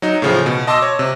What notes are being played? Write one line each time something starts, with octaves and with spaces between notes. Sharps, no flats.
F#3 D#4
A2 C#3 F3
B2
D#5 A5 C6 D6 E6 A#6
C#5
C3